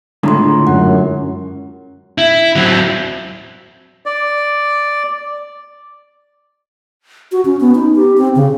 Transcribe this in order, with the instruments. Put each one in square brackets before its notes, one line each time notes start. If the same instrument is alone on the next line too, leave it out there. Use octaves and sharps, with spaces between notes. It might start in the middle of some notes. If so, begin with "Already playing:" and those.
[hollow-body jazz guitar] C#2 A2 D3 [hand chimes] D4 A#5 C6
[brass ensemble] F#2 [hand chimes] F#5
[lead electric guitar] E4
F#3 C4
[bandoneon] D5
[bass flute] F#4
C#4
B3
D#4
G4
C4
C#3